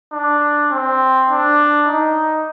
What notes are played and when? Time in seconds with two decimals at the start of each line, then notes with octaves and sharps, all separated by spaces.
0.13 D4
0.71 C4
1.29 D4
1.87 D#4